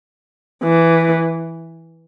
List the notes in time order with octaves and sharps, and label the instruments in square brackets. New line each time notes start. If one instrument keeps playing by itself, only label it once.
[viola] E3